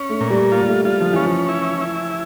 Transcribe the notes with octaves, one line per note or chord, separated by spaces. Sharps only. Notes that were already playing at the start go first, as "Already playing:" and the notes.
Already playing: C#4
A3
A#2
G3
A#3 F4
G3
A3
G3 F4
F3
E3 C#4
F3
E4
E4